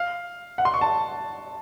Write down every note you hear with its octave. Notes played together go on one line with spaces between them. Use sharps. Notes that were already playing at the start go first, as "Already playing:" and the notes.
Already playing: F5
F#5
C6
C#6
A5